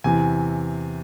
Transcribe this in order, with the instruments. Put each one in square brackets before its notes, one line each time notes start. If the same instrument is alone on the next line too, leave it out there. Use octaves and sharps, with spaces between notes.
[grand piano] E2 C3 E3 G#5